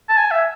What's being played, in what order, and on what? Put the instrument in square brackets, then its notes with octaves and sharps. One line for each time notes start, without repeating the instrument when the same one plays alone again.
[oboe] A5
G#5
E5